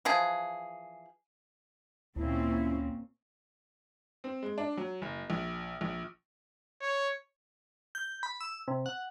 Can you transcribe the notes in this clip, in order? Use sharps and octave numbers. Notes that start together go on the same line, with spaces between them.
E3 F3 G#4
D2 A#2 C4 C#4 E4
C4
G#3
D4
F#3
F#1
A#1
A#1
C#5
G6
B5
E6
C3
F#5